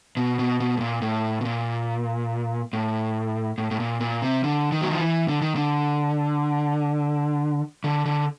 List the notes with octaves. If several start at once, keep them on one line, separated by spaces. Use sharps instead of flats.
B2
B2
B2
A2
A#2
A2
B2
A#2
A2
A2
A2
A#2
A#2
C3
D3
D#3
F#3
F3
E3
D3
D#3
D3
D3
D3